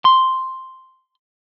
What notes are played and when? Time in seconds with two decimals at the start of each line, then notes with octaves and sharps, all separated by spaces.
0.05 C6